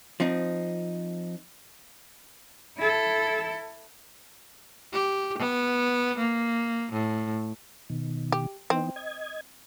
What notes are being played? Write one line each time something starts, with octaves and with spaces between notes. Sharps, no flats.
F3 C4 D#4
E4 A4
G4
B3
A#3
A2
B2 D#3
G4
E3 B3 C4 D#4
D#5 G#6